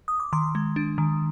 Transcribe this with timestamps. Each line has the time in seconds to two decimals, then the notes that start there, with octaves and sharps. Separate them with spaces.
0.08 D#6
0.20 D6
0.33 D#3 C6
0.55 G#3
0.76 D4
0.98 D#3